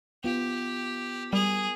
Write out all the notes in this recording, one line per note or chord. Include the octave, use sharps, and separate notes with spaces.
B3 F4 G4
G3 G#4 A#4